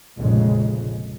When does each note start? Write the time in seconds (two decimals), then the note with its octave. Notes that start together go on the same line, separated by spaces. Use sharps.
0.16 F1 A#1 F2 A#2 C#3 G#3